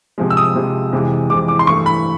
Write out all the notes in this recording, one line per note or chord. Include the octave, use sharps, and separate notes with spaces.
C3 F3 G#3
E6
D#6
C3 F3 G#3
F2 C3 E3 G#3
F2 C3 E3 G#3 D6
D6
C6
G2 E3 A3 C#6
B5